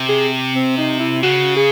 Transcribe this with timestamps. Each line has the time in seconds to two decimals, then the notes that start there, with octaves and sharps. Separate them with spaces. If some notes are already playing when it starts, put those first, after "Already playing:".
Already playing: C3
0.09 G#4
0.55 C4
0.78 D#4
0.99 E4
1.23 C#3 F#4
1.56 G#4